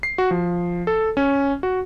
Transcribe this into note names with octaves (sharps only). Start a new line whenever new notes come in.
C7
F#4
F3
A4
C#4
F#4